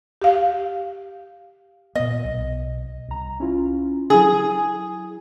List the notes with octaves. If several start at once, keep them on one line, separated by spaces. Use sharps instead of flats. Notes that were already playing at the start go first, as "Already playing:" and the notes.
G4 F5
A#2 B3 D#5
B1
C2 A#5
C#4 E4 F4
F#3 E4 G#4